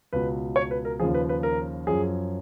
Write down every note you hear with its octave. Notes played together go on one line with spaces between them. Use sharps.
C#2 B2 B4
C#5
B4
A#4
D#2 C#3 F3 G#4
B4
B4
A#4
F#2 F3 G#4